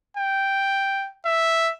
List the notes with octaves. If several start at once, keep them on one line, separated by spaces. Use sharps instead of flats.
G5
E5